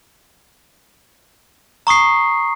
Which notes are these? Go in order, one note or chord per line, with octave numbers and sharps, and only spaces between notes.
A#5 C#6 D#6 C7